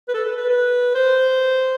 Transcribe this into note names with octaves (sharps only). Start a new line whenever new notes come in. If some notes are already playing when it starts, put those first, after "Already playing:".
B4
A4
B4
B4
B4
C5